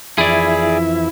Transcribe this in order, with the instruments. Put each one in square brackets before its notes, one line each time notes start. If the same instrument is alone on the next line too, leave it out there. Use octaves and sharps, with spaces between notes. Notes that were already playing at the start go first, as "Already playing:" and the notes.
[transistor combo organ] F2 E3 E5 [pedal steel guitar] E4 [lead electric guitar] G#4 D5